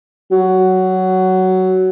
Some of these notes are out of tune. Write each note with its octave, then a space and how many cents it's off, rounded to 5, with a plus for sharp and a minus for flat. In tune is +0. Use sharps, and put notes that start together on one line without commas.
F#3 +10